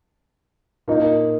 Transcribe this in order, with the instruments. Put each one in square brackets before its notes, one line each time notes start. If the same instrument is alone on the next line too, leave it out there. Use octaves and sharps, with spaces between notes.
[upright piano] A#2 A#3 D#4